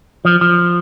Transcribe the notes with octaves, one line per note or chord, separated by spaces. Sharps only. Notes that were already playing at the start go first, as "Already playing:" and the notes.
F3
F3